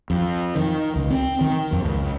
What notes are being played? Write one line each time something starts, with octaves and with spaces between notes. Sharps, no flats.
F2
D#3
C#2
C4
D#3
F2
C#2